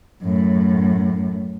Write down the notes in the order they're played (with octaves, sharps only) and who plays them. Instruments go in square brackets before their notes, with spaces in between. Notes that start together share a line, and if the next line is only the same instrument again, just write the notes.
[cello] F#2 A2